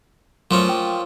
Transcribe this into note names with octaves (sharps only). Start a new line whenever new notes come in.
A#2 F3 F#3 A3 C#4
G5